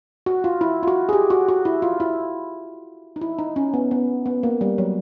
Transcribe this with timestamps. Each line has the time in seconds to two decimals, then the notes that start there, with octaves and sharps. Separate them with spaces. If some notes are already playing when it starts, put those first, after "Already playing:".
0.26 F#4
0.44 F4
0.61 E4
0.83 F4
0.88 F#4
1.09 G#4
1.13 G4
1.30 F#4
1.48 F#4
1.65 E4
1.82 F4
2.00 E4
3.16 D#4
3.21 E4
3.39 D#4
3.56 C#4
3.74 B3
3.91 B3
4.26 B3
4.43 A#3
4.61 G3
4.78 F#3